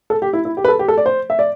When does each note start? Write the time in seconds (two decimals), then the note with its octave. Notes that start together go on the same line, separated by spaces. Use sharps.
0.10 A4
0.22 G4
0.33 E4
0.45 E4
0.57 G4
0.65 B4
0.68 A4
0.79 G4
0.88 A4
0.98 D5
1.06 C5
1.30 E5
1.39 D5